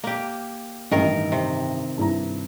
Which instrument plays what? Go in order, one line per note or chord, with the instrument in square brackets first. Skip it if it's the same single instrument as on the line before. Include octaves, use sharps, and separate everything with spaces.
[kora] A#3 G4
[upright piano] A1 G2 [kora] D#3 A#4
[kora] C3
[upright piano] G2 E4 A#5